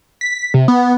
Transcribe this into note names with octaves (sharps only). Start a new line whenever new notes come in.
B6
C3
B3